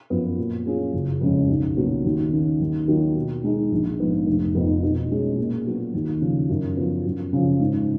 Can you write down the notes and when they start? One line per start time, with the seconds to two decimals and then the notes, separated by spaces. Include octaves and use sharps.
0.10 F#2 F3 B3
0.38 A#2
0.65 F#3 C#4 F4 G#4
0.93 F#1
1.21 F2 C#3 G#3 C#4
1.48 B1
1.77 A#2 F#3 B3
2.05 D#2
2.32 D#3 A#3 C#4
2.61 D#2
2.87 D#3 F#3 A#3 F4
3.15 B2
3.44 G#3 D#4 G#4
3.72 A#1
4.00 G#2 F3 B3 F4
4.27 F1
4.55 F2 F3 B3 D#4
4.83 B2
5.11 G#3 C#4 G#4
5.38 A#2
5.66 F#3 B3 F#4
5.94 D#2
6.21 C#3 F3
6.50 F#2
6.77 F3 B3
7.05 F#2
7.33 C#3 F3
7.60 G#2